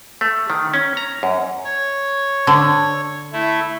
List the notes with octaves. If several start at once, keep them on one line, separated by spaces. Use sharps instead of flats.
A3
D#3
C#4
A#5
F#2
C#5
D3
A3 E4